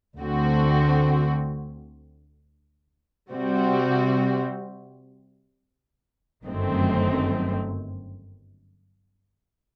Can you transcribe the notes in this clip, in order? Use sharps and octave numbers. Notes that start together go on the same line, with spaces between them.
D2 D3 A3 C4 F#4
C3 G3 C4 F#4
G1 F#2 D#3 A3 C4